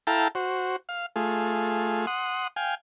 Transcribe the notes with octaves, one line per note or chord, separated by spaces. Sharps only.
E4 A4 F5 G5 A5 A#5
F#4 C5
F5
A3 F4 G#4
F#5 C6 D#6
F5 G5 G#5